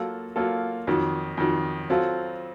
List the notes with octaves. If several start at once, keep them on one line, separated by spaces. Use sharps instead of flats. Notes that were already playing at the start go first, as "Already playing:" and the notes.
Already playing: F#3 A#3 F4 A4
F#3 A#3 F4 A4
F2 D#3 F#3
F2 D#3 F#3
F#3 C4 F4 A4